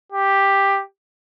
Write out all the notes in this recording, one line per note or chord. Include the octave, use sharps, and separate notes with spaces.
G4